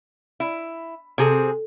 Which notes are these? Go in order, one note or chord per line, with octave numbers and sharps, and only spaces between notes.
E4
C3 C4 G#4 A4